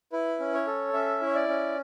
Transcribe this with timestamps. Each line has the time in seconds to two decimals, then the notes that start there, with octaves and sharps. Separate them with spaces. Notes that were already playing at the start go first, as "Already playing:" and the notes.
0.12 E4 B4
0.40 C#4
0.53 C#5
0.67 A4
0.93 C#4 E5
1.21 E4 C#5
1.35 D5
1.48 C#4